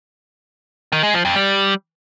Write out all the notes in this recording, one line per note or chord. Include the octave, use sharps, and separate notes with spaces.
D#3
G#3
F3
F2
G3